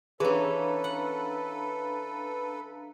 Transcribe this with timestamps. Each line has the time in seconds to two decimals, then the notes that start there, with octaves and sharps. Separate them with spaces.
0.20 E3 C#4 D4 G#4 A4 B4 F5 A#5
0.84 F#5